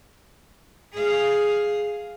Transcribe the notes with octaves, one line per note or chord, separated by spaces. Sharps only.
G#4 F5